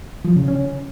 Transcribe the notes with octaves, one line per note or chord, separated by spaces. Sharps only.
F3
C#3
C#4